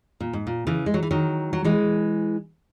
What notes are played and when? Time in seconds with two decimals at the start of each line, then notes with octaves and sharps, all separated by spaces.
0.20 A#2
0.33 G#2
0.47 A#2
0.67 C#3 E3
0.86 G#3
0.94 F#3
1.03 E3
1.11 D#3 F#3
1.53 F#3
1.64 E3 G#3